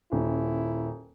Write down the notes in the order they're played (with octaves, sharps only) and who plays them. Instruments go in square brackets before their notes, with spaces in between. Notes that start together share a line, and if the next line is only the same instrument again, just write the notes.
[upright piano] D#1 D#2 C#4 [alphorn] E4